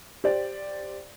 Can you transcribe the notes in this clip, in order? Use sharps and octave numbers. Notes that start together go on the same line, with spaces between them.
G4 C5 D5